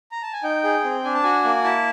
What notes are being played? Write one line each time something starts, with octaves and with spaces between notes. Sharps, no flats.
A#5
A5
G#5
D#4 G5
G#4
C4
D4 G#5
A5
F#4 G#5
A#3
E4 A5